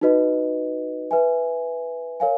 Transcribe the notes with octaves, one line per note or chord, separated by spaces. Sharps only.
D#4 F#4 B4 D#5
B4 E5 G#5
A#4 C#5 F5 G#5